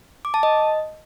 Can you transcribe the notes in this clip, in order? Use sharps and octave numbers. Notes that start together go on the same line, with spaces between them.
D6
A5
D#5